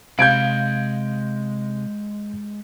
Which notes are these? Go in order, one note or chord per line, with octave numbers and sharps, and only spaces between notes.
C3 G#3 F5 B5 G6 G#6 D7